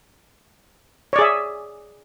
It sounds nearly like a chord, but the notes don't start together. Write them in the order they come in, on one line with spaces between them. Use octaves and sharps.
C#5 D5 G#4 E5